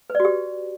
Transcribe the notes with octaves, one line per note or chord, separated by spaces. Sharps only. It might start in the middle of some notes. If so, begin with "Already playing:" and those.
B4
D5
F#4
G4